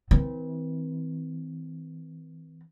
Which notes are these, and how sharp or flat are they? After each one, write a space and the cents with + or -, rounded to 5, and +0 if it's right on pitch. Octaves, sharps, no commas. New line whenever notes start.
E3 -40 C4 -25